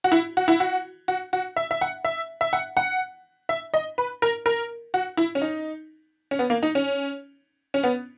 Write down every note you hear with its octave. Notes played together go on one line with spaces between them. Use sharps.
F#4
E4
F#4
E4
F#4
F#4
F#4
E5
E5
F#5
E5
E5
F#5
F#5
E5
D#5
B4
A#4
A#4
F#4
E4
C#4
D#4
C#4
B3
A#3
D#4
C#4
C#4
B3